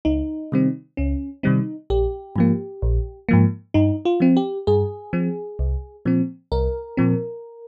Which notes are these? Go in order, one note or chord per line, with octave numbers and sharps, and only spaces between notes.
C#2 D#4
C3 D#3 G3 C4
C#2 C#4
C3 D#3 G3 C4 D#4
A#1 G4
G#2 F3 A#3
A#1
G#2 F3 A#3
G2 D#4
F4
F3 C4
G4
G2 G#4
F3 C4
C2
A#2 F3 C4
C2 A#4
A#2 F3 C4